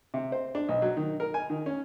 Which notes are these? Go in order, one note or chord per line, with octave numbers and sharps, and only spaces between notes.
C3
C5
D4
B1
F#3
D#3
A#4
G#5
D#3
C#4